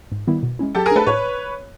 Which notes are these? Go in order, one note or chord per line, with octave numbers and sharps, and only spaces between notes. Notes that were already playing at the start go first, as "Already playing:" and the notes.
G#2
D#3 G3 B3 E4
B2
G#3 C#4 E4
F#3 G4 A4
G#4 A#4
A3 D4 A4 B4
A2 B4 C#5